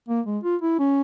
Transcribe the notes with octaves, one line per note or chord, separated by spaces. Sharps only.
A#3
G#3
F4
E4
C#4